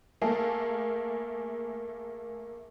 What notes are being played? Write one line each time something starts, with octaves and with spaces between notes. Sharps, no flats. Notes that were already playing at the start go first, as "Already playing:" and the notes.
A3 A#3 G#4 A4 F5